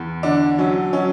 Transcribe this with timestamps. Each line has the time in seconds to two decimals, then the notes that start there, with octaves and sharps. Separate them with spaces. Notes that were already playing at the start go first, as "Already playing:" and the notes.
Already playing: E2
0.23 D3 D4
0.58 F#3 C#4
0.93 F#3 C#4